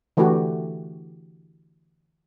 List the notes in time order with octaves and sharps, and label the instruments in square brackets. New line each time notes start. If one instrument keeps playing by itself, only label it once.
[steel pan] D3 E3 A3 E4 F#4 G4